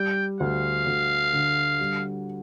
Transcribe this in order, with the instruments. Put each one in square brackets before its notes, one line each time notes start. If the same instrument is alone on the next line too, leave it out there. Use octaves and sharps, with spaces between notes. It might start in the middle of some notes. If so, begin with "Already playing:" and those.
Already playing: [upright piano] G3 [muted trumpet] G5
[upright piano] D2 [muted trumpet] F5
[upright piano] D2
D3
G3